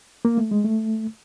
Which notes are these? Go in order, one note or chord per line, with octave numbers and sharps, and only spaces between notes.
A#3
A3
G#3
A3